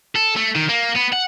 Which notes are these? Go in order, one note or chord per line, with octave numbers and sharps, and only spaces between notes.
A4
A3
D#3
A#3
B3
F#5